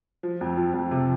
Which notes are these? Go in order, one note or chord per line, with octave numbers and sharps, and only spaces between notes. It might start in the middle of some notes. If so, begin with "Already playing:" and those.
F3
F2
F3
F2
C3